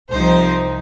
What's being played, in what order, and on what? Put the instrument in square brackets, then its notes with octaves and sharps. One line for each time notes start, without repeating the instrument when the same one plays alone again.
[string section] C2 C3 F3 D#4 C5